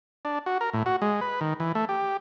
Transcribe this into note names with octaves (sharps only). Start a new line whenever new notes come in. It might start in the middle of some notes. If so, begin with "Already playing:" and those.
D4
F#4
A#4
A2
F#4
G#3
B4
D#3
E3
A3
G4